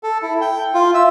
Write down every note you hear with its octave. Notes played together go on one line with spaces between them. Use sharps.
A4
E4
G5
F4
E5